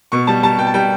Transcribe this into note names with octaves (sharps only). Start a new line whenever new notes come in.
B2 C#6
G3 A5
G3 A5
B2 G5
A5
G3 G5